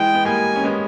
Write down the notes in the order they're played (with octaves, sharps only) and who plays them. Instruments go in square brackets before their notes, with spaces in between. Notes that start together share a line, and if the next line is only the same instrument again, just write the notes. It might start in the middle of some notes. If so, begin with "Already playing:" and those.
Already playing: [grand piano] E3 G#3 [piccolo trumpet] G5
[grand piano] B3
[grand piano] G3 A#3 [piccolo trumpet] G#5
[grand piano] C#4
G#3 B3